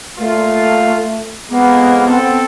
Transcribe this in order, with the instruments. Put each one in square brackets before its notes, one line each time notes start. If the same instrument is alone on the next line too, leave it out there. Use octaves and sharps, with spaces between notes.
[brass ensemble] A#2 F4 [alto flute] A3
[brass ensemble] F2 G#3 A#3 [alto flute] B3
[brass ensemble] C4 A4